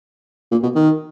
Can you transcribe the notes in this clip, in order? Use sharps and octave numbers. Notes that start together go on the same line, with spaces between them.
A#2
B2
D#3